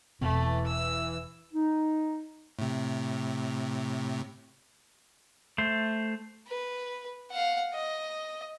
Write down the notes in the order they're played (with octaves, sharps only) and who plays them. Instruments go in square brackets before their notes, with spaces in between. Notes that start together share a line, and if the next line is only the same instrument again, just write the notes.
[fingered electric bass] E1 B2 C4 [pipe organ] E3 [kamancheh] A3
[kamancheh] E6
[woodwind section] D#4
[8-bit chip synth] A2 C3
[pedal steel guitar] A3 C5
[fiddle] B4
F5 F#5
D#5